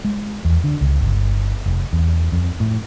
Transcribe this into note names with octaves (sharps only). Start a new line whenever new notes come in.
G#3
E2
D3
C#2
G1
F1
E2
F2
A2